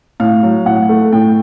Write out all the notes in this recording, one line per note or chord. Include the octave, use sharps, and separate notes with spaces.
A2 F5
F#3
A2 F#5
A3
A2 G5